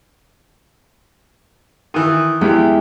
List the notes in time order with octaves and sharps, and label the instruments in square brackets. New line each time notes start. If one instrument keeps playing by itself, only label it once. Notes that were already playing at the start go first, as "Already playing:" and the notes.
[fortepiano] D#3 E3 [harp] D#6
[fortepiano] E2 [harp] G#3 E4 G4